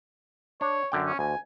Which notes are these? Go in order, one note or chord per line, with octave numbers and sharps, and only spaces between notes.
D4 C#5
F#2 D3 G5
C#4
D2 G#5